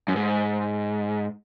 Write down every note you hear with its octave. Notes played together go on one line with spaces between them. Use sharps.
F#2
G#2